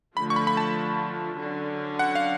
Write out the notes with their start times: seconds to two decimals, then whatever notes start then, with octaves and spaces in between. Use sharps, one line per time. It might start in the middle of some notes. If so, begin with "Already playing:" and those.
0.16 D3 F3 A3 F4 B5
0.30 C#6
0.36 B5
0.47 B5
0.57 A5
1.39 D3 F#3 C#4
1.99 F#5
2.15 F5